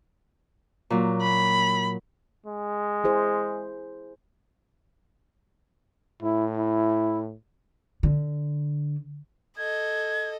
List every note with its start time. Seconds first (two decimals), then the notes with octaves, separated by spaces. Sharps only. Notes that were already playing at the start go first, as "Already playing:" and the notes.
0.90 A#2 F#3
1.22 B5
2.46 G#3
3.04 E4 G#4 C5
6.22 A2 E4
6.57 E4
8.03 D3
9.57 A4 D#5 G#6